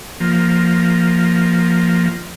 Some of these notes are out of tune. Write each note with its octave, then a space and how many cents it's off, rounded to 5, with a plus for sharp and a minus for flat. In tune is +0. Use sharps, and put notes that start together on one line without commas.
F3 +0 A#3 +0